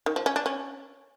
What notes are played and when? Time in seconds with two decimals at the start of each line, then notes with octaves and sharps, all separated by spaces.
0.06 D#3
0.16 F3
0.26 C#4
0.36 D4
0.46 C#4